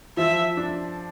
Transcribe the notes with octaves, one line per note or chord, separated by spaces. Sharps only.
F3 E5
D4